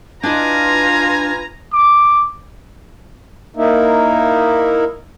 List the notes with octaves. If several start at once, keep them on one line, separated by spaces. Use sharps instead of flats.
D4 E4 F4 B4 D#5 G#5 A#5
D6
A#3 D#4 E4